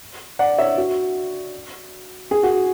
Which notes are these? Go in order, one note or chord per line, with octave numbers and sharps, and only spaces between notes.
D5 F#5
C#5 E5
F#4
G#4
F#4